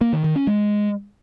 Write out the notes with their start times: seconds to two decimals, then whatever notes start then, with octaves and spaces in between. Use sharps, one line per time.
0.01 A#3
0.13 D#3
0.24 D#3
0.36 C#4
0.47 G#3